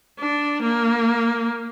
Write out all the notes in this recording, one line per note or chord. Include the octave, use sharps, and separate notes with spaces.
D4
A#3